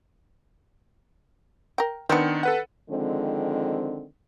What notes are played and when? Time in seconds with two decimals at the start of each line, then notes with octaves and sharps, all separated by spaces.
1.78 A#4 G5
2.09 D#3 B3 C4 D4 C#7
2.43 A4 B4 F#5
2.90 D3 D#3 F3 G#3 C4